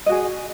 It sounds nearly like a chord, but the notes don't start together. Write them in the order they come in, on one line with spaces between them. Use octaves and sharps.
D#5 F#4 G#4